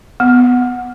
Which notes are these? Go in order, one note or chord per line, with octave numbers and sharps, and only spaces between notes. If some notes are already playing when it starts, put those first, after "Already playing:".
B3